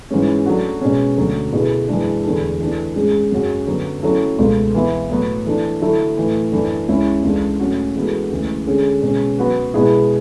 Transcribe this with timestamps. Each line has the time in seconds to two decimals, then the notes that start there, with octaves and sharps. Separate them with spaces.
0.11 G#2 E3 G#3 C#4
0.46 F#3 A3 D4 F#4
0.81 B2 G#3 C#4
1.17 D2 D3 F#3
1.52 B2 A3 E4 G#4 B4
1.88 F#2 E3 G#3 D4
2.24 E2 D3 A3 D4 A4
2.60 E3 A3 D4 A4
2.95 G#2 G#3 C#4 G#4
3.31 F#2 C#3 F#3 C#4 F#4
3.67 D3 F#3 B3
4.02 F#3 A3 C#4 E4 A4
4.39 C#2 B2 A3
4.74 E3 B3 E4
5.10 A2 F#3 B3
5.46 E3 A3 D4
5.81 D3 F#3 A3 E4 A4
6.17 A2 E3 A3 E4
6.52 F#2 E3 A3 D4
6.88 C#2 C#3 G#3 C#4 E4
7.24 C#2 C#3 E3 A3 D4
7.60 A2 F#3 C#4 F#4
7.96 E3 G#3 B3 F#4 A4
8.31 D2 C#3 E3 G#3
8.67 D3 G#3 C#4 G#4
9.02 B2 G#3 C#4
9.38 F#3 B3 F#4 B4
9.74 B2 G#3 B3 E4 G#4